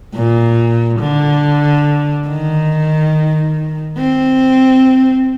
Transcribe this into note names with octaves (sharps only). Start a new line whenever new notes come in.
A#2
D3
D#3
C4